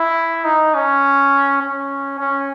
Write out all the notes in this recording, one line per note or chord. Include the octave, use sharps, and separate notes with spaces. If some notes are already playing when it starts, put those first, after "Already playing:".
Already playing: E4
D#4
C#4
C#4
C#4